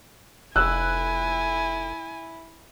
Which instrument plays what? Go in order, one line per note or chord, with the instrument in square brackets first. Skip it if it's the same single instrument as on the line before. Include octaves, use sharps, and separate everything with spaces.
[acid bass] F1 [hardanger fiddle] E4 [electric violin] G#5 [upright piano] E6 F#6